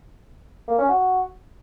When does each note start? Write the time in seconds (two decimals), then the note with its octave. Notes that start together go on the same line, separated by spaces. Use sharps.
0.68 A#3
0.79 C#4
0.89 F#4